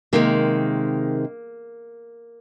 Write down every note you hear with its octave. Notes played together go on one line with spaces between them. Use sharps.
C3 D#3 G#3 A#3